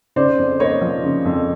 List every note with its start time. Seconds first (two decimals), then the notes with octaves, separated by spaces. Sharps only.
0.16 C#3 C5 D5
0.38 F2
0.60 A#3 C#5 D#5
0.82 F3
1.03 C#3
1.25 F2